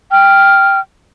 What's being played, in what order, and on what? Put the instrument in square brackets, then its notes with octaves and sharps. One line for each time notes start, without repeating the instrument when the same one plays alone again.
[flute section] G5 F6